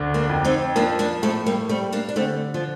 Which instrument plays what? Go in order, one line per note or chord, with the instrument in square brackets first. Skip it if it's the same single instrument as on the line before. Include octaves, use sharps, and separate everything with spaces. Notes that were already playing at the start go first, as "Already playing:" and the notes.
Already playing: [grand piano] D2 D3
[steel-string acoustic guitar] A#3 D4
[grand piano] F2
[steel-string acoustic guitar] C4 D#4
[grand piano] F3 [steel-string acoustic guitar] A#3 D4
[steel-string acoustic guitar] A#3 D4
[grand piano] A2 [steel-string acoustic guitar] A3 C4
[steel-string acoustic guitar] G3 A#3
[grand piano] G3 [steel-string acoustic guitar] A3 C4
[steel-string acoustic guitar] A#3 D4
D4
[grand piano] D3 [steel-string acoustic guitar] A3 C4
[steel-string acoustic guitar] F3